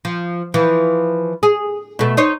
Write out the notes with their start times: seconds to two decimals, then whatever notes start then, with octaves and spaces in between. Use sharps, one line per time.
0.05 F3
0.54 E3 F3
1.43 G#4
1.99 B2 A3
2.17 D#4 C5 C#5